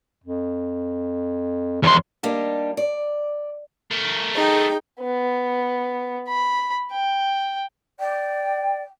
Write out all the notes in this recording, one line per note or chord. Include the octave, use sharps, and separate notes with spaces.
F2
E2 F3 C6
G3 A#3 D4 D#4 G4
D5
A3 A#4
D#4 G#4 G5
B3
B5
G5
D5 G5